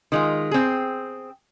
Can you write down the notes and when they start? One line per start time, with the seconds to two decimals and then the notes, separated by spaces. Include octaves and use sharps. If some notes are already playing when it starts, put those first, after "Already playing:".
0.12 D#3 G#3 F4
0.51 C4 G#4